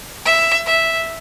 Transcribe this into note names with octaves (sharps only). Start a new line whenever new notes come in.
E5
E5